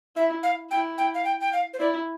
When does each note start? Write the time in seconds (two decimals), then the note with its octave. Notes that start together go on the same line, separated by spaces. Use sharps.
0.16 E4 E5
0.43 F5
0.71 E4 G5
0.98 G5
1.14 F5
1.25 G5
1.41 G5
1.53 F5
1.73 C5
1.80 E4 D5